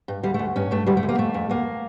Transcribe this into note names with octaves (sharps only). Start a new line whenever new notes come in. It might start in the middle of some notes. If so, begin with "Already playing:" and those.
G2
D2 G3
A3
D2
G2 C#4
G2 A3
D2 G3
A3
D2
A#3
F2 A3
F2
D2 A#3